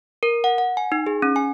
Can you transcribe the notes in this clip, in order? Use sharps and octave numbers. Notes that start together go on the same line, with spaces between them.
A#4
F#5
F#5
G#5
D#4
G#4
C#4
G#5